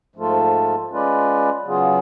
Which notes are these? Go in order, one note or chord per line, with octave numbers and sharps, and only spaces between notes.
G#2 F3 A3 F4 A4
G#3 C#4 F4 B4 D5
C#3 F#3 B3 F4 G#4